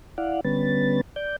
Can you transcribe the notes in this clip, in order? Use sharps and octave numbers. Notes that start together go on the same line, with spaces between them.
E4 D5 F5 F#5
D3 G3 B3 C#4 B4 A6
D5 G6